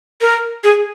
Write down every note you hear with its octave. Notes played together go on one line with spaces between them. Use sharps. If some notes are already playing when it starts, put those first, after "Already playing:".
A#4
G#4